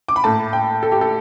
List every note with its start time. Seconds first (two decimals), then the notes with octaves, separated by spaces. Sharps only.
0.09 D6
0.16 B5
0.24 A2 A3 A5
0.53 G5
0.83 A4
0.92 G4
1.01 A4